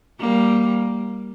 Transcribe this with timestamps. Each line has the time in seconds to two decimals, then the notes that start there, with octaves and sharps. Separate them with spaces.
0.20 G3 A#3